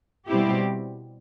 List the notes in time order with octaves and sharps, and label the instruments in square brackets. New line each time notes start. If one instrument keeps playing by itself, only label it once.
[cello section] B2 G3 C4 E4 G4